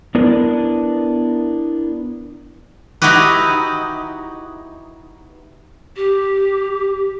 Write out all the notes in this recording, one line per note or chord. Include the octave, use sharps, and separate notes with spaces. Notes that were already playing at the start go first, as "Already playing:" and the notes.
B3 D4 E4 A#4 B4
D#4 E4 F#4 G4 B4
G4